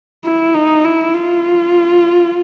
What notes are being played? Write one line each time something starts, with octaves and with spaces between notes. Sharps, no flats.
E4
D#4
E4
F4